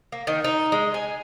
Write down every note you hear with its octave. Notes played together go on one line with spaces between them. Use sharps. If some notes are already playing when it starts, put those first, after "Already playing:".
A#3
D#3
D#4
G#3
G#5